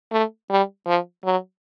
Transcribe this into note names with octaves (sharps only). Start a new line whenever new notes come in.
A3
G3
F3
F#3